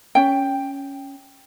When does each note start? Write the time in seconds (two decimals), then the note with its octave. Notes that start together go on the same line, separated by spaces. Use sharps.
0.15 C#4 G5